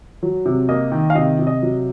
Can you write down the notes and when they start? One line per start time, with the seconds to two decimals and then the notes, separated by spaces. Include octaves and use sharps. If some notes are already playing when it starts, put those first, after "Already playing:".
0.23 F#3
0.46 C3
0.69 A#3 D#5
0.92 D#3
1.10 F5
1.15 C3 D#5
1.39 C3
1.47 D#5
1.62 F#3